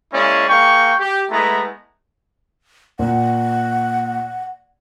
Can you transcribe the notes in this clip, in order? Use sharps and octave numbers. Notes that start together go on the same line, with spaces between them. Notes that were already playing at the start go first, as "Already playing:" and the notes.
G#3 A#3 C#4 E4 D5
A#3 G#4 G5 C#6
G4
G#3 A3 B3 E4 A#5
A#2 F#5